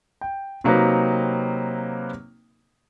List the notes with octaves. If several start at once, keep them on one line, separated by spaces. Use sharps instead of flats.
G5
C3 F#3 A#3 C4 D#4 B4